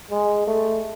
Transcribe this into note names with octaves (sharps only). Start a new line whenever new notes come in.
G#3
A3